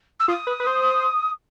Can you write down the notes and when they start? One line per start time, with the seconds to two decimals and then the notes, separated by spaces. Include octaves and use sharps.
0.20 E6
0.28 F4 D#6
0.47 B4
0.60 B4
0.67 C5